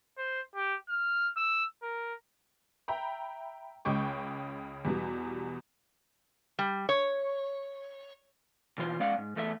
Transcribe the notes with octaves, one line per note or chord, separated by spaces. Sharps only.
C5
G4
F6
E6
A#4
E5 G5 A#5 B5
C#2 C#3 G#3 G5 C#6 D6
E2 B2 G3
G3
C#5
B2 E3 F4 C5
G#3 C#4 D5 F5 F#5
G#2
E2 A3 D#4 E5